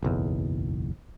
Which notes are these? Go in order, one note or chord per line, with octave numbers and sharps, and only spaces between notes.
F#1 B1 E2